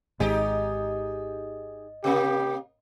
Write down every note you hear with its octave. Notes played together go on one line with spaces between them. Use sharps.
G#1 G#2 D#4 G4 G#4 D#5
C3 A#3 G4